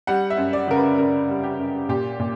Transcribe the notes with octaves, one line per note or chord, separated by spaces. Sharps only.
G3 F#5
E5
F#2
D5
C#3 A#4
B4
F#2 A#4
G3
G4
F#2
A#2 G4
A#2